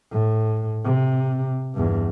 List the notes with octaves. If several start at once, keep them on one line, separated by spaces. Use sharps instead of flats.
A2
C3
E2 G2